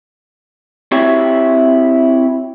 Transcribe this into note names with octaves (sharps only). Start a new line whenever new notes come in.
C4 E4 F#4 G4 C#5 E5